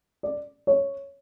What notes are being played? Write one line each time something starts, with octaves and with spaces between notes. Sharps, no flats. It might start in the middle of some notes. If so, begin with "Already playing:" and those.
D5
C#5